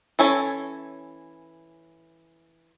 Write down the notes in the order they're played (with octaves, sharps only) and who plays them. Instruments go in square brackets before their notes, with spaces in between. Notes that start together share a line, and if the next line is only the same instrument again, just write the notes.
[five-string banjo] E3 C#4 A4 C#5